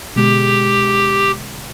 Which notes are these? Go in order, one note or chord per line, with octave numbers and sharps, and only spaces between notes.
B2 D3 G#3 G4